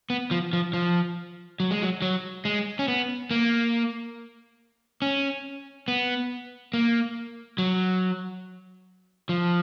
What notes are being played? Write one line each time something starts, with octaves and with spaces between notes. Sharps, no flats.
B3
F3
F3
F3
F#3
G#3
F#3
F#3
G#3
C#4
B3
A#3
C#4
B3
A#3
F#3
F3